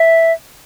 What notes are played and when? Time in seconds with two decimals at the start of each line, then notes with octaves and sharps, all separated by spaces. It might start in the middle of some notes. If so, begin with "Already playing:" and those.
Already playing: E5